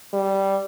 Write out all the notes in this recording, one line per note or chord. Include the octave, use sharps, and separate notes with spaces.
G3